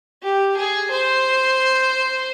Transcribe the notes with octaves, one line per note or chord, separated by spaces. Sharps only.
G4
G#4
C5